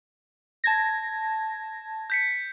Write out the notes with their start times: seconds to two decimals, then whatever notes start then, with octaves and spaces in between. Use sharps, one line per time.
0.64 A5 G#6 A#6
2.10 G6 B6 C#7